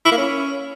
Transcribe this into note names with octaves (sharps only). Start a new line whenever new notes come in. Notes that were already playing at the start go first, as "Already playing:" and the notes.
E4
A#3
C#4